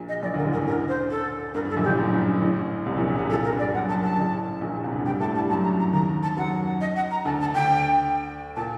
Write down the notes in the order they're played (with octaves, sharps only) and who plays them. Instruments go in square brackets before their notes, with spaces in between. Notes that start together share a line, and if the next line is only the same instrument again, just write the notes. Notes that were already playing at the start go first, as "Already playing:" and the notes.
Already playing: [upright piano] A#1 A#2
[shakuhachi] D#5
[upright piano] A#1 A#2 [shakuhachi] D5
[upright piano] D2 D3 [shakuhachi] A#4
[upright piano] A1 A2
[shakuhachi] A#4
[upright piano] G2
[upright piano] D2 D3 [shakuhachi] A#4
[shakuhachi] C5
A4
[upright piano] G2 [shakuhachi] A#4
[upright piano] G2 [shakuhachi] A4
[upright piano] A#1 A#2
[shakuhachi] G4
[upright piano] A1 A2
F#2
G2
G2
A1 A2
C2 C3
A#1 A#2
A#1 A#2
C2 C3
[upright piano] A#1 A#2 [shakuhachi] A4
[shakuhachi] A#4
[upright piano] G2
[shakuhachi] D5
[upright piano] F#2 [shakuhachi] F#5
[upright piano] F#2 [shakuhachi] A5
[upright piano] G2 [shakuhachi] A5
[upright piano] A1 A2
A#1 A#2
C2 C3
D2 D3
[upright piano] G2 G3 [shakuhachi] G5
[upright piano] A2 A3 [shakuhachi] A5
[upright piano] G2 G3 [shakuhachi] A5
[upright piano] F#2 F#3 [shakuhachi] A5
[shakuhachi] A#5
A#5
[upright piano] D#2 D#3 [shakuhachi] A#5
[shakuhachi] A5
[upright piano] F#2 F#3 [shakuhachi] F#5
[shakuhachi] D#5
F#5
A#5
[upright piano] D2 D3 [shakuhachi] A5
[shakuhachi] A5
[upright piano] D2 D3 [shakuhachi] G5
[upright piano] A#2 [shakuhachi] A5